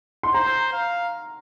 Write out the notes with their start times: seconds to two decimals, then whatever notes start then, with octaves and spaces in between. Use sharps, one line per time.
0.23 C6
0.34 C5 A#5
0.73 F5